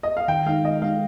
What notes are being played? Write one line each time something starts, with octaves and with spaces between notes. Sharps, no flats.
D#5
F5
D#3 G5
G#3 D#4 F5
D#3 D#5
G#3 D#4 F5